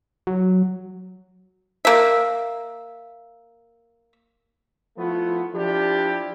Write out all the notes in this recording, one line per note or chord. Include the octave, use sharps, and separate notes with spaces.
F#3
A#3 E5
F3 A3 B3 E4 F4
F3 D4 E4 G4